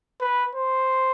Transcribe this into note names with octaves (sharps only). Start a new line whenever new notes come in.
B4
C5